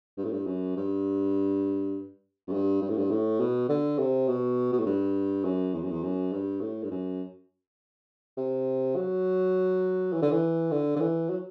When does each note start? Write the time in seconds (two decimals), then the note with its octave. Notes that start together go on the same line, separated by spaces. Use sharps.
0.18 G2
0.25 A2
0.32 G2
0.47 F#2
0.76 G2
2.47 F#2
2.53 G2
2.82 G2
2.90 A2
2.98 G2
3.11 A2
3.40 B2
3.69 D3
3.99 C3
4.28 B2
4.72 B2
4.79 A2
4.86 G2
5.45 F#2
5.74 E2
5.83 F#2
5.91 E2
6.03 F#2
6.33 G2
6.61 A2
6.83 G2
6.91 F#2
8.37 C3
8.96 F#3
10.13 E3
10.22 D3
10.31 E3
10.71 D3
10.96 D3
11.00 E3
11.30 F#3